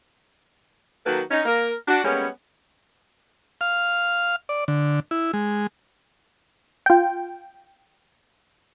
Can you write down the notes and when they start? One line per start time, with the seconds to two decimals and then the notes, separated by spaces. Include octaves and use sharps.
1.06 D#3 F#3 A#3 F#4 A4 B4
1.31 C#4 D#4
1.46 A#3 A#4
1.88 D4 F#4
2.05 G3 G#3 A#3 B3 C#4
3.61 F5
4.49 D5
4.68 D3
5.11 E4
5.34 G#3
6.86 F4 G5